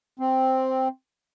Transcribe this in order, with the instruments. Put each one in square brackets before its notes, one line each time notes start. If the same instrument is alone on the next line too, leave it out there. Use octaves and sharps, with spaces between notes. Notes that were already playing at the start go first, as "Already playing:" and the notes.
[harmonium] C4